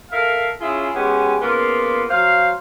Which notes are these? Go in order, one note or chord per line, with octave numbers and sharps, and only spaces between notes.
A4 A#4 E5 F5
C#4 E4 F4 G#4
G#3 B3 C#4 G4
C#3 A#3 B3 F4
F#3 C5 F5